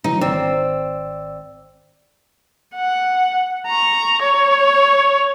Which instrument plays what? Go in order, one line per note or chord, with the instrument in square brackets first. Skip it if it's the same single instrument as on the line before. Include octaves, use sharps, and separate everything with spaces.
[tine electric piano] C#3 E3 F#3 [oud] D#4
[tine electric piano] G#1 D5 E6 [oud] C4
[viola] F#5
A#5 C#6
C#5